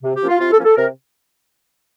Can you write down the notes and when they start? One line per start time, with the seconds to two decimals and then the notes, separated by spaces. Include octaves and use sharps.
0.03 C3
0.15 G4
0.22 F3 A#3 C#4
0.28 F4
0.39 C3 F4
0.52 A4
0.59 F3 A#3 C#4
0.65 A4
0.76 C3 A#4